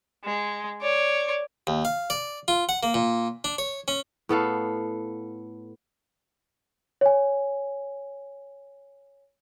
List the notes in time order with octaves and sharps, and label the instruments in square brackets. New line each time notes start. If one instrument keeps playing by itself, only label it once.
[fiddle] G#3
C#5 D5
[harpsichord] D#2
F5
D5
F4
F#5
A#3
A#2
D4
C#5
C#4
[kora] A2 B3 A4 F5
[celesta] C#5 G#5